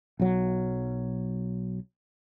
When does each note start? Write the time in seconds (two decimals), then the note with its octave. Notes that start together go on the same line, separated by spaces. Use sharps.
0.20 B1 F#3